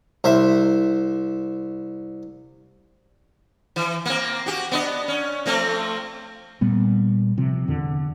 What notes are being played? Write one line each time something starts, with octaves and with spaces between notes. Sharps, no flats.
C2 C5 E5
E3
A#3 C4
F#4 G4
B3 D4 D#5
C#4
F3 A3 C4
A#2 G3 B3
C3 F3
E2 D3